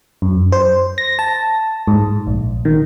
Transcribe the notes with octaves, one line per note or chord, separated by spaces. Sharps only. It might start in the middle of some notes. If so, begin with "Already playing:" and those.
F#2
C5
A#6
A5
G#2
A#1
D#3